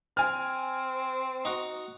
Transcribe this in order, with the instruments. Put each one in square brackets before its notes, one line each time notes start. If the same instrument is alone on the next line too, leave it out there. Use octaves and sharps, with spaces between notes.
[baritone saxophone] C4 [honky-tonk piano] G#5 F6
[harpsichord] D#4 F#4